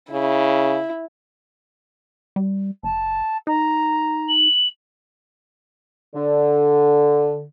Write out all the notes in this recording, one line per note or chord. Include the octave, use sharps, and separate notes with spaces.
C#3 E4
G3
F#1 A5
D#4 A#5
F#7
D3